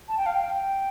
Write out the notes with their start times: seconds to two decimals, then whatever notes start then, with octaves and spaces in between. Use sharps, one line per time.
0.08 A5
0.17 G5
0.26 F5
0.34 G5